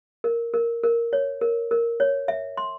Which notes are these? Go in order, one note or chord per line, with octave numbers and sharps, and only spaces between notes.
A#4
A#4
A#4
C#5
A#4
A#4
C#5
E5
C6